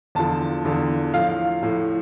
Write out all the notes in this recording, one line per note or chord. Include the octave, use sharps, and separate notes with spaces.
E2 D3 F3 A5
E2 D3 F3
A2 F3 F5
A2 F3